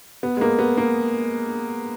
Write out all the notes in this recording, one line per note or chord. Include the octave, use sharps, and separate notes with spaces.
B3
G#3
A#3
B3
A#3